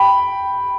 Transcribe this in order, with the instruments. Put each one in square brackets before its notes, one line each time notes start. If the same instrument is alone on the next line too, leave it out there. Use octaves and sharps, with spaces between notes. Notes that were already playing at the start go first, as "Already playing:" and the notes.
Already playing: [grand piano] G5 B5